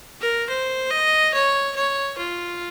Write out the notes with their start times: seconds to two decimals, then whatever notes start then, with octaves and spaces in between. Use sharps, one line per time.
0.21 A#4
0.50 C5
0.91 D#5
1.34 C#5
1.76 C#5
2.18 F4